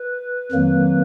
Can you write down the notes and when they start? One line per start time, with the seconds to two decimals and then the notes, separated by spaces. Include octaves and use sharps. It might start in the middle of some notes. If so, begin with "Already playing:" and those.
Already playing: B4
0.52 F2 D#3 F#3 A#3